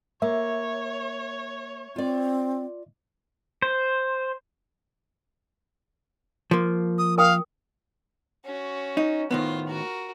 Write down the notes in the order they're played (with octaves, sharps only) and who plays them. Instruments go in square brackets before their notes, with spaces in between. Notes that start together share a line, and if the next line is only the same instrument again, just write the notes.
[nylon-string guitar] A#3 [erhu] C#5 [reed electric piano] E5
[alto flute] C4 [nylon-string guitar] F4 D5
[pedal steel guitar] C5
[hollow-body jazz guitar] F3 A#3
[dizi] D#6
[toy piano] A#4 G5 D#6 [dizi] F5
[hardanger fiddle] C#4 F#4
[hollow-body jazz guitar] D#4
[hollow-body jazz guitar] A2 D#3 B3 [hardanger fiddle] F4 C5
[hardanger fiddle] F#4 A#4